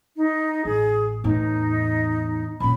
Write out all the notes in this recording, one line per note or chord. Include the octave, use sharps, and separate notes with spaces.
D#4
A1 G#4
E2 A2 D#4
A#2 C#4 B5